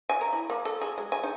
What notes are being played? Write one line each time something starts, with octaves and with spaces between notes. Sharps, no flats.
G#5
A#4
E4
A#3
A4
G#4
G#3
G#5
D#4